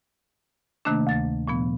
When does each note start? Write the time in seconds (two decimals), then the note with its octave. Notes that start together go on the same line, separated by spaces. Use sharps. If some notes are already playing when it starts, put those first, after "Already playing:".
0.85 C3 D#3 A3 A#3 D4
1.07 D2 A6
1.48 A#2 F3 B3